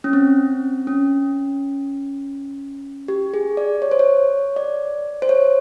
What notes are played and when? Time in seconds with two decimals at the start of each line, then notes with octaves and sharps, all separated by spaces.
0.04 C#4
0.13 C4
0.87 C#4
3.08 G4
3.34 G#4
3.57 D5
3.82 C#5
3.91 C5
3.99 C#5
4.56 D5
5.22 C5
5.29 C#5